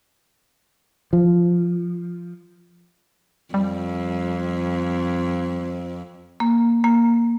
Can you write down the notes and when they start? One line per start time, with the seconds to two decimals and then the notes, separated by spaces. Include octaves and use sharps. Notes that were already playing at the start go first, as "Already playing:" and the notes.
1.13 F3
3.54 F2 G3
6.40 A#3
6.84 A#3